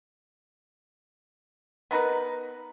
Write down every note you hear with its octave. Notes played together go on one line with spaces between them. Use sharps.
B3 D#4 A#4 B4